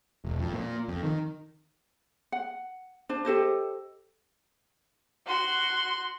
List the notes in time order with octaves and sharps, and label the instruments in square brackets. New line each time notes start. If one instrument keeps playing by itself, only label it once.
[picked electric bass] E1
F2
A#2
F2
D#3
[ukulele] F#5
D4 C5
G4 A4 C5 D#5
[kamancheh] F#4 C6